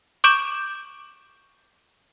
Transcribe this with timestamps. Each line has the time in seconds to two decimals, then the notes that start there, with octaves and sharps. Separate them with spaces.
0.24 C#6 D6 G6 D7 E7